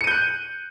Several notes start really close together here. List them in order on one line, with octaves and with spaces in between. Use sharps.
C#7 D#7 G6 F#6